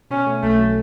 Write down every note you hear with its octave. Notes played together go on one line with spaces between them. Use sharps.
B2 C#4
A3
B1 A3
F#3